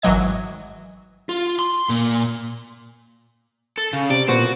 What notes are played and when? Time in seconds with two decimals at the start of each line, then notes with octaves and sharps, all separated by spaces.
0.02 G#1 E3 F#3 D#5 G#6
1.29 F4
1.59 C6
1.89 A#2
3.78 A4
3.93 C#3
4.10 C3 D5
4.28 A#2 B3 F#4 C5